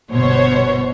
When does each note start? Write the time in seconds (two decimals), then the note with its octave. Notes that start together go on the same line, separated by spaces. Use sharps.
0.11 G1 B2 C5 C#5